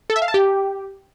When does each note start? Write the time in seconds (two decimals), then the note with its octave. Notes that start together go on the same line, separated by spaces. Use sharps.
0.10 A4
0.16 E5
0.22 F5
0.28 A5
0.34 G4